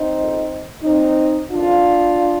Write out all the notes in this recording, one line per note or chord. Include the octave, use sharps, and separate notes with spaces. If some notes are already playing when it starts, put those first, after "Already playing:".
Already playing: C4 D#4
F2 D#3
A#2 F3 C4 D#4
F2 D#3 D4 F4